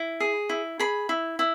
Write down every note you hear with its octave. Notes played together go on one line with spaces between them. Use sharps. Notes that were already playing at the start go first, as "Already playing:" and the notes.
Already playing: E4
G#4
E4
G#4 B5
E4
E4